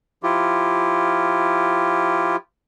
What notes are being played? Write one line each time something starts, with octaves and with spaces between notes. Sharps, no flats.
F3 E4 F4 G4